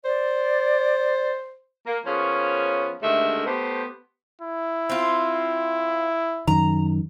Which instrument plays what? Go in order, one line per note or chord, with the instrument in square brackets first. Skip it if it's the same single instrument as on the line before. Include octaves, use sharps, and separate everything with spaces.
[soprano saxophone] C5 [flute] D5
[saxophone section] A#3
F3 A#3 B3 C#4 G#4 C#5
D#2 D3 G#3 A3 A#4 E5
A3 B3 G4 C5
[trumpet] E4
[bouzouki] C4 F4
[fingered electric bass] F#2 D#3 [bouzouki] A#5